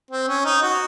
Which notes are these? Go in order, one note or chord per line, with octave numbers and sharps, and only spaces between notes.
C4
C#4
D#4
F#4